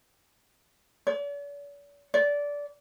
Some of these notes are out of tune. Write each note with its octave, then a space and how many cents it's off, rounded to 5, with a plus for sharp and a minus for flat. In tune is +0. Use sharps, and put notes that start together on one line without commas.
D5 -45
D5 -20